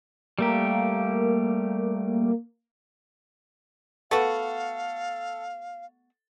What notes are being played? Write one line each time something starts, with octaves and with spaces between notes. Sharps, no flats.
G3 A3 A#3 G4
A3 B3 F#4 A4 F5